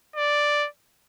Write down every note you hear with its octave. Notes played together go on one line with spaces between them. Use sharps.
D5